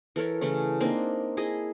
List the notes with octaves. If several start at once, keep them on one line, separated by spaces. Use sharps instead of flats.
E3 A4 A#4 C#5
C#3 E3 A3 C#4
A#3 C4 D4 D#4
E4 G#4 D#5